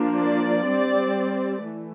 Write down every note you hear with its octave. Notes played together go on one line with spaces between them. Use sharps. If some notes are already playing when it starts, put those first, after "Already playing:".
Already playing: F3 A#3 D4
D5
G3 C4
E3 A3